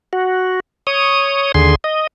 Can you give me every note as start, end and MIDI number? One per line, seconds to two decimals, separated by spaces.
0.13 0.60 66
0.87 1.52 73
0.87 1.52 87
1.54 1.75 39
1.54 1.75 50
1.54 1.75 68
1.54 1.75 84
1.84 2.07 75